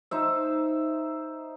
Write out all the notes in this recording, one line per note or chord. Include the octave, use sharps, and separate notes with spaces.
D#4 C5 E5